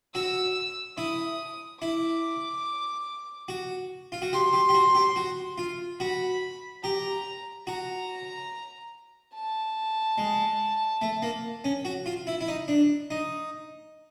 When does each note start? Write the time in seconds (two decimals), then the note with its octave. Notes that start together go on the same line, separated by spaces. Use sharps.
0.14 F#4 E6
0.98 E4 D#6
1.82 E4 D6
3.48 F#4
4.12 F4
4.22 F#4
4.33 G4 C6
4.53 G4
4.69 G4
4.74 F#4
4.95 G4
5.16 F#4
5.58 F4
6.00 F#4 B5
6.84 G4 A#5
7.67 F#4 A#5
9.34 A5
10.18 G#3
11.02 A3
11.22 A#3
11.64 C#4
11.85 F#4
12.06 F4
12.27 E4
12.41 E4
12.48 D#4
12.68 D4
13.11 D#4